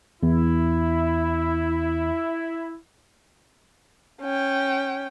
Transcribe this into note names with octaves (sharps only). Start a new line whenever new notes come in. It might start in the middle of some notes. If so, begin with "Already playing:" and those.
E2 E4
C#4 G5